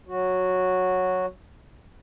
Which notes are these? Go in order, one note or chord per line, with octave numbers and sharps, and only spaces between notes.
F#3 F#4